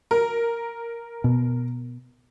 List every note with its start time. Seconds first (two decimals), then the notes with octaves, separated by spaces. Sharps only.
0.11 A#4
1.24 B2